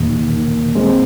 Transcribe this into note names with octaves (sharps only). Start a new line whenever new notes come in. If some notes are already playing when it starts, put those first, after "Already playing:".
Already playing: D#2 A#2 D#3
G#3 C4